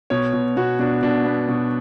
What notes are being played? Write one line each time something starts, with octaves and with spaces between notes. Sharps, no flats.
B2 C#5
B2
B2 F#4
B2 D4
B2 D4
B3
B2